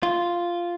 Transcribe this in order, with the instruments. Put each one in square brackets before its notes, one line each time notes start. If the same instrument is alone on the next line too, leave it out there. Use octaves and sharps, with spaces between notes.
[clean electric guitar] F4